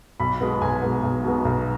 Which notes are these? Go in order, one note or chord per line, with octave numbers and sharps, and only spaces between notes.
B1 B5
B2 G#3 B3
B1 G#5
B2 G#3 B3
B1
B2 G#3 B3
B1